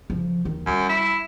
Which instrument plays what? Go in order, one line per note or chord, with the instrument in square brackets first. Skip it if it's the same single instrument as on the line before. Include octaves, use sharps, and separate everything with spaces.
[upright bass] C#3 F3
D#2 D#3
[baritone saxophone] F#2 [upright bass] G3
[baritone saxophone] E4